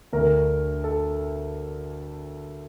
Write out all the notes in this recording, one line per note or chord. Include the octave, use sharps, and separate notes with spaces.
D2 D3 A3 A#4
A4